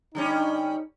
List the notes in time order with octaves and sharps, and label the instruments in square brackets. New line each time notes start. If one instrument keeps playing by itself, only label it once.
[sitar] D3 G3 C#4 [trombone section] D#4